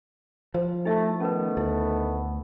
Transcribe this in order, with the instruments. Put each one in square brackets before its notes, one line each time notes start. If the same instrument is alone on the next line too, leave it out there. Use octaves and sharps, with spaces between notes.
[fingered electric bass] F3 [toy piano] C5
[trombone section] A3 [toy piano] D#4 E4 E5
[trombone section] D#3 A3 B3 [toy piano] C#4 A#4 B4
[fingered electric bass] D2 [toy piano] E4